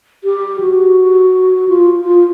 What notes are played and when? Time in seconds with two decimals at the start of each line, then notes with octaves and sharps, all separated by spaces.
0.24 G4
0.60 F#4
1.68 F4
2.05 F4